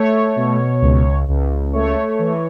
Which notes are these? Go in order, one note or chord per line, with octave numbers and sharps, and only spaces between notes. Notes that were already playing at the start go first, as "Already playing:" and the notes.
Already playing: A3 C#5
B2
C#2
C#2
A3 C#5
E3